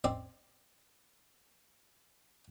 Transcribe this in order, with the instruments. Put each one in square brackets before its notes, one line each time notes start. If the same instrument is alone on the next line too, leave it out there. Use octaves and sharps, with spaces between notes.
[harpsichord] C4 D5